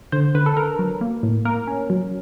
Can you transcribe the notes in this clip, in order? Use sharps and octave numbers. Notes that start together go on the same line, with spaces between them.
D3 C5
D3 B4
A4
D3 A#4
F#3
A#3
A2
A#3 A#4
C#4
F#3